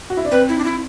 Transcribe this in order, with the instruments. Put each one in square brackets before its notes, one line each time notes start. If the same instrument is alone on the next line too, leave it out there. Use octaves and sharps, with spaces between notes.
[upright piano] F#4
E4
D4
[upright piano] C4 [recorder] B4
[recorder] E4
D4
E4